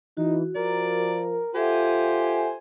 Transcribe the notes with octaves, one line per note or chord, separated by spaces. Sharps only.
E3 D#4 F#4
F3 A#4 D5
F4 G4 A4 C5 E5 F#5 G#5